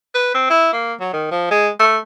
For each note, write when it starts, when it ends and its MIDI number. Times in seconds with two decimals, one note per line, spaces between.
0.14 0.33 71
0.34 0.49 60
0.50 0.71 64
0.73 0.93 58
1.00 1.10 54
1.13 1.29 51
1.31 1.49 53
1.50 1.69 56
1.79 1.97 57